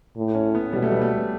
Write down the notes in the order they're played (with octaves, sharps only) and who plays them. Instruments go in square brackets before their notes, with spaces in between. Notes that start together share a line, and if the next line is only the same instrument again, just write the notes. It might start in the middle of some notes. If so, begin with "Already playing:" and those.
[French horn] A2
[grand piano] C#4
B3
[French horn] B2 [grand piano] G3
[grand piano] A3
G3
A3